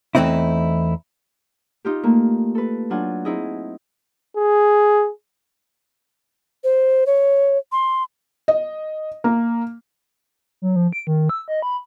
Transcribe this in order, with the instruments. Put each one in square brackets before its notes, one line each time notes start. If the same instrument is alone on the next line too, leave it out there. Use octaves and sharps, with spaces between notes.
[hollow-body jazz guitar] E2 E3 A3 C4 D#4 E4
[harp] D#4 F4 G4
A3 A#3
A4 B4
F#3 D4 F4 F#5 G#5
C4 D#4 E4 G#4 D#5
[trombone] G#4
[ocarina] C5
C#5
C6
[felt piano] D#5
A#3
[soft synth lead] F#3
F3
D7
D#3
E6
D#5
B5